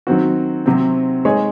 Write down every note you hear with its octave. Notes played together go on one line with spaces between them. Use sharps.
D#3 F#3 C4 F#4
C3 F#3 C4
G#3 D#4 G#4 C#5